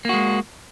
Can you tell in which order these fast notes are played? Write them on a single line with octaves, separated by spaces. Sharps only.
A#3 F#4 G#3